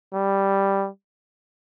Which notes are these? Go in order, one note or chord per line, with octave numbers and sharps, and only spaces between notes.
G3